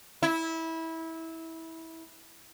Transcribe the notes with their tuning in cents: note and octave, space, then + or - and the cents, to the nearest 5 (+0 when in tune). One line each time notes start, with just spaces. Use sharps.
E4 -20